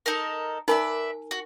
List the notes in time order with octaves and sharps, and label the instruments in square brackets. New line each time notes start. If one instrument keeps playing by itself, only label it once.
[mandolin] D#4 A4 A#4
[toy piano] D#4 A#4 G#5 [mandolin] B4 D5 E5
[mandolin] F#4